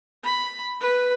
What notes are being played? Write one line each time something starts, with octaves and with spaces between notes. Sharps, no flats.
B5
B4